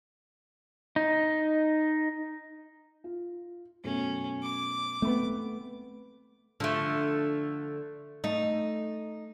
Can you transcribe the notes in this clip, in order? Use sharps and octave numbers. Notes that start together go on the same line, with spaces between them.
D#4
F4
F#2 B2 A3 C#4
D6
A3 B3 C4 B5
D3 F3 A3
A3 D#4